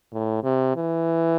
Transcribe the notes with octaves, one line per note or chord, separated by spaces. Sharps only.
A2
C3
E3